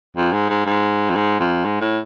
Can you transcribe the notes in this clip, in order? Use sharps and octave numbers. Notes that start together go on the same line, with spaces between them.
F2
G#2
G#2
G#2
F2
G#2
F2
G#2
A2